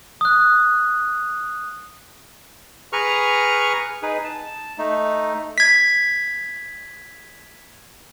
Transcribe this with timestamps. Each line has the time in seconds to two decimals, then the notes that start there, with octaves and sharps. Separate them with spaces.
0.21 D#6 F#6
2.93 G#4 B4 A#5 C#6 F6
4.03 D#4 G#4 B4
4.24 A5
4.78 A3 D#4
5.58 G#6 B6